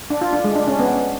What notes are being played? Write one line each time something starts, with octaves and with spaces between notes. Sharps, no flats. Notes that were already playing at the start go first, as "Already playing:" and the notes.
D4
F4
D4
G#3
D4
C#4
B3